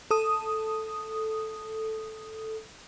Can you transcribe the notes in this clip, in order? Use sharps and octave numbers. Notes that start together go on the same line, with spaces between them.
A4 D#6